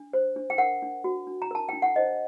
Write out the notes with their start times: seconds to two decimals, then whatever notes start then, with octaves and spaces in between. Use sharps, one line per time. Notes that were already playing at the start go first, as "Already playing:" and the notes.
Already playing: D4
0.13 C5
0.36 D4
0.50 G5
0.58 A#4 F#5
0.82 D4
1.04 F#4
1.27 D4
1.42 A#5
1.51 A#4 A5
1.69 D4 G5
1.82 F#5
1.96 C5 D#5